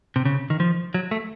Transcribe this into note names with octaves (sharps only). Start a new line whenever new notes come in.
C3
C#3
D#3
F3
F#3
A3